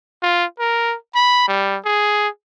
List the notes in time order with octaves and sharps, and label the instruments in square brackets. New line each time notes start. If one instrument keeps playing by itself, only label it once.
[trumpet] F4
A#4
B5
G3
G#4